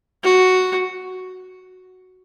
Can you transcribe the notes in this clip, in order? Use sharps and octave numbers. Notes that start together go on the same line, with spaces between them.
F#4